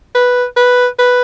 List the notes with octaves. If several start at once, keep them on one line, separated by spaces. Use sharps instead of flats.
B4
B4
B4